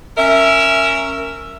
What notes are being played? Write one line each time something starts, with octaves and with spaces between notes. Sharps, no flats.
C#4 A#4 E5